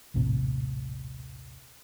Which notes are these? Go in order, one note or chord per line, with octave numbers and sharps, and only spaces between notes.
A#1 D#2 A2 C3